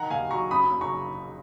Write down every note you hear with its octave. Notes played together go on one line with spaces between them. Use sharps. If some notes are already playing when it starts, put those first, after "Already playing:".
Already playing: D#3 F#5 A#5
D#2 F5 G#5
F#3 A#5 C#6
F#2 B5 D#6
F#1
A#5 C#6